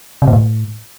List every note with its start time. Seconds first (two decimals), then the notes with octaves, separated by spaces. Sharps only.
0.22 C3
0.27 A#2
0.33 A2